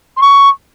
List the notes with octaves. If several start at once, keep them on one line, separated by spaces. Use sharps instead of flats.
C6
C#6